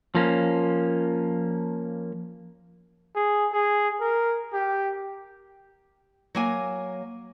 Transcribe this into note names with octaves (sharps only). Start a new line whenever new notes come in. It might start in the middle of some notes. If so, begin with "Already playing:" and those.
F3 A#3 C#4
G#4
G#4
A#4
G4
F#3 A#3 G#5